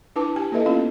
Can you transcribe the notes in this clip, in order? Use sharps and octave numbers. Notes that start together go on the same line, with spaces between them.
D4 E4 B4 A5 D6
G4 G#5
A#3 E4 A4 B4 D#5 E5
B3 C#4 F4 F5